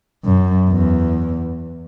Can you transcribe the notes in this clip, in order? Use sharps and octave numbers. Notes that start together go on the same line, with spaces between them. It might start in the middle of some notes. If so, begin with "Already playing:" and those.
F#2
E2